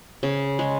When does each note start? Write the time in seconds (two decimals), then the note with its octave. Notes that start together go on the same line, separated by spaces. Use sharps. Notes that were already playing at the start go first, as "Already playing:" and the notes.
0.23 C#3
0.59 G#3